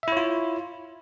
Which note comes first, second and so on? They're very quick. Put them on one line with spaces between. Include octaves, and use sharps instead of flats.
E5 E4 C#5 F4